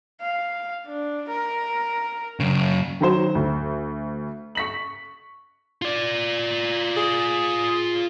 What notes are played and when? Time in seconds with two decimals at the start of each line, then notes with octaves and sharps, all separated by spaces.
0.21 F5
0.86 D4
1.29 A#4
2.40 F#2 C#3
3.01 D#3 F#3 C5
3.35 D2
4.55 C#6 B6 F#7
5.82 F4 D5
6.97 G#4